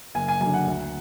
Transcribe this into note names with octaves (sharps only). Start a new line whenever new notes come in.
F#1 G#5
G#5
F#2 D3 G#5
F#5
D2